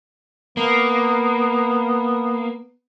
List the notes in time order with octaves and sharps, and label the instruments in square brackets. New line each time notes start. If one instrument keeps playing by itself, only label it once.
[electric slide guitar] A#3 [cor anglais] B3